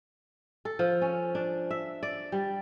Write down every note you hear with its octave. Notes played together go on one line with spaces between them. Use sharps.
A4
F3
C#4
D4
E5
D5
G3